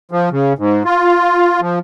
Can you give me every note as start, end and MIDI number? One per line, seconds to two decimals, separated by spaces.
0.11 0.29 53
0.31 0.53 49
0.58 0.83 44
0.85 1.60 65
1.61 1.79 53